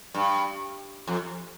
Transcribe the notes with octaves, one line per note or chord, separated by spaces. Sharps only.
G2
F2